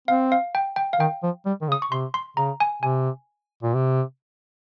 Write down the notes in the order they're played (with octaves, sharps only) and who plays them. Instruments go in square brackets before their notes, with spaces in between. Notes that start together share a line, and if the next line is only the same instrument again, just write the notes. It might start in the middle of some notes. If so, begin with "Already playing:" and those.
[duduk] C4 [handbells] F5
[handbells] F5
G5
G5
F5
[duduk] D#3 [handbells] G5
[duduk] F3
G3
D#3
C#3
[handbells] D#6
C#6
[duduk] C3 [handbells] C6
[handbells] C6
[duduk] C#3 [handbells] A#5
[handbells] G#5
[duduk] C3 [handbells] G#5
[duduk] A#2
C3